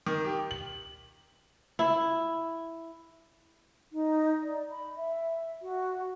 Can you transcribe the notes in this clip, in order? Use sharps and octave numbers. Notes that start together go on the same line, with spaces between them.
D#3
G4
F#7
E4
D#4
D5
B5
E5
F#4